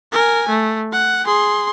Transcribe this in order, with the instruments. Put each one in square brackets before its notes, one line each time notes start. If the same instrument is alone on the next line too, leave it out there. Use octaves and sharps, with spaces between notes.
[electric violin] A#4 G#5
A3
F#5
G#4 C6